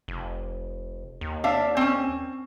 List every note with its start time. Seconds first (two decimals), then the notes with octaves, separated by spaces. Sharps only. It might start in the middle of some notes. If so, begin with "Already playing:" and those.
0.08 F1
1.21 D#2
1.44 D4 E5 F5
1.77 C4 C#4